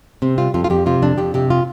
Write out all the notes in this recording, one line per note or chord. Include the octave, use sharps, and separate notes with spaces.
C3 C4
G3 F4
F2 F4
F4
F2 G4
C3 F4
F2 D4
F2 G4
C3 G4
F4